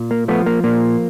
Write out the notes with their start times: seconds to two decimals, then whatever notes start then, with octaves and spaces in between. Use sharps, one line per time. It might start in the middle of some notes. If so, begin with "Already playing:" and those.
Already playing: A#2
0.11 A#3
0.28 F3 A3 B3
0.46 A#3
0.64 A#2 A#3